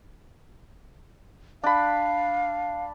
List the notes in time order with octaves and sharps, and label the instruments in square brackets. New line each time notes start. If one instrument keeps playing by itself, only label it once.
[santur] D4 B5 [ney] F5